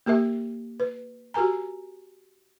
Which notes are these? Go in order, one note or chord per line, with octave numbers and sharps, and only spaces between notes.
A#3 G4 A#4 E5
B4
F#4 G4 A#4 G#5 A#5